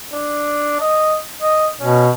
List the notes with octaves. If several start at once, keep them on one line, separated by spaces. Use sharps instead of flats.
D4
D#5
D#5
B2 C#4